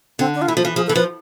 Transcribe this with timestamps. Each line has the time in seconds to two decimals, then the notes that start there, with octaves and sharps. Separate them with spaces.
0.19 D3 C4
0.34 D4
0.42 F4
0.48 E3 E4
0.57 F3
0.62 F4
0.65 E3
0.76 F3 G#4
0.87 E3 A4
0.95 F3 B4